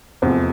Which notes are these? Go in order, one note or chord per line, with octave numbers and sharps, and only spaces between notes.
F1 E2 C3 F3 C4